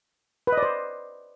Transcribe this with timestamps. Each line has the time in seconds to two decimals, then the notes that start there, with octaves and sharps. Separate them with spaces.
0.47 B4
0.52 D#5
0.58 D5
0.63 C5